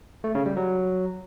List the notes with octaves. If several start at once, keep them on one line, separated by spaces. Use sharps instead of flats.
A3
C#3
G3
F#3